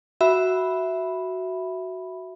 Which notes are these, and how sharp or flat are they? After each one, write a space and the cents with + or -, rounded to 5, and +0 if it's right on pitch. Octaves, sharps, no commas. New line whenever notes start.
F#4 +5 E5 +0 B5 +0